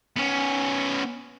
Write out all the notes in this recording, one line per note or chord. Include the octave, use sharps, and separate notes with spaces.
B3 C#4